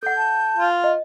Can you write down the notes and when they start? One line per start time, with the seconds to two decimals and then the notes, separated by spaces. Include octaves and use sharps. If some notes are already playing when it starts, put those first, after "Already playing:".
0.03 A4 F#5 G6
0.17 A5
0.57 F4
0.84 D#5